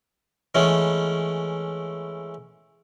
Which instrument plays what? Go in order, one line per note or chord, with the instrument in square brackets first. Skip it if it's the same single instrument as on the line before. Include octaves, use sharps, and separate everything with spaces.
[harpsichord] E3 G#3 A3 B3 C#4